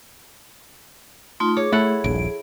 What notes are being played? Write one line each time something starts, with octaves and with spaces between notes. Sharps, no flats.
A3 D#4 F4 C6
G#4 C#5 D6
A3 E4 A4 F#5
D#1 A#1 D7